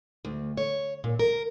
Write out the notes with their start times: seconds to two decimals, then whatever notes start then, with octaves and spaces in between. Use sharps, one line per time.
0.25 D2
0.57 C#5
1.04 A#2
1.19 A#4